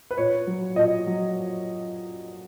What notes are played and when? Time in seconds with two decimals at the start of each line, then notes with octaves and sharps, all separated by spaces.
0.11 B4
0.18 A#2 C#5
0.47 F#3
0.76 A#2 D#5
1.07 F#3